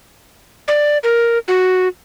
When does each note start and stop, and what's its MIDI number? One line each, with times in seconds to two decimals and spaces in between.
0.68 0.98 74
1.03 1.38 70
1.48 1.88 66